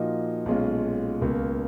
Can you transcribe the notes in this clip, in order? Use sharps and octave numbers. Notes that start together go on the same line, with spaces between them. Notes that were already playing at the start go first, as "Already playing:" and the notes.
Already playing: A#2 F3 A#3 D#4 F#4
B1 A#2 G#3 C#4 F4
C#2 B2 A#3